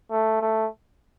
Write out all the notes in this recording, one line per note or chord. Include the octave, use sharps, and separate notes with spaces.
A3
A3